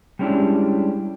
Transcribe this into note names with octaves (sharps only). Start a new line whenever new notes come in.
G3 G#3 C#4 D4 E4 G4